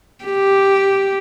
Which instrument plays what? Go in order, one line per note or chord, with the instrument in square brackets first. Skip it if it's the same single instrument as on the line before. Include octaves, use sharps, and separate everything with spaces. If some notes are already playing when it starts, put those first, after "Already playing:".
[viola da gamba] G4